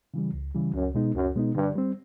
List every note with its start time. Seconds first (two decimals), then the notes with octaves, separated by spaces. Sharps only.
0.14 C#3 E3 G3
0.34 C#2
0.55 C#3 E3 G3
0.74 C#2 F#2
0.95 B2 G#3 B3 D#4
1.14 C#2 F#2
1.35 B2 G#3 B3 D#4
1.55 G2 D3
1.75 G3 C4